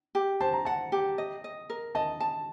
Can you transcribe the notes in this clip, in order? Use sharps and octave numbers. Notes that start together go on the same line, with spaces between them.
G4
C5 A5
A#5
F#5 A5
G4
D#5
D#5
A#4
D#5 A5
A5